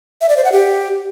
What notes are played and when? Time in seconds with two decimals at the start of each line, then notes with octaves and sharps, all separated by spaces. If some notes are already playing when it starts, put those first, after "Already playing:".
0.21 E5
0.29 D5
0.37 C5
0.45 F#5
0.52 G4